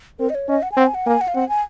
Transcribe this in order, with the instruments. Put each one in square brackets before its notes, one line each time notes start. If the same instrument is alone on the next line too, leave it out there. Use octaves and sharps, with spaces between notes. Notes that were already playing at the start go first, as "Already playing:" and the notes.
[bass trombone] C4 [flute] A#4
[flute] D#5
C#5
[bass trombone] C#4 [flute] D#5
[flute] F#5
G#5
[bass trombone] C4 [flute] F#5
[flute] G#5
F#5
[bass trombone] A#3 [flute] G#5
[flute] F#5
F5
[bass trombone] C4 [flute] F#5
[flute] G#5